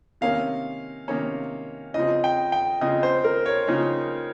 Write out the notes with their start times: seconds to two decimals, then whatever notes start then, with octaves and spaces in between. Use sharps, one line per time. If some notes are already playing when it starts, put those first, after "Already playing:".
0.21 C3 D#3 A#3 C#4 F5
1.08 C3 D#3 A#3 C#4
1.94 C#3 F3 C4 D#5
2.24 G5
2.52 G5
2.81 C#3 F3 C4 D#5
3.03 C5
3.24 A#4
3.46 C#5
3.67 C#3 F3 A#3 D#4